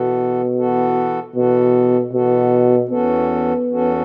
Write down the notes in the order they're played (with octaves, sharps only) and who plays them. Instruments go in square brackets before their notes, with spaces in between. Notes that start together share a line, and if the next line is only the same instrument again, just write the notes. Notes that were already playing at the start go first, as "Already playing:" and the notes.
Already playing: [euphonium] B2 [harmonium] E3 B3 F#4 A4
[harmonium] E3 B3 F#4 A4
[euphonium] B2 [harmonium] E3 B3 F#4 A4
[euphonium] B2 [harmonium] E3 B3 F#4 A4
[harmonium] E2 E3 C#4 F#4 A4 [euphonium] B3
[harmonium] E2 E3 C#4 F#4 A4